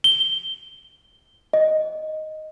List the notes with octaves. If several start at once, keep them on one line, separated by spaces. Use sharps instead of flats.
G7
D#5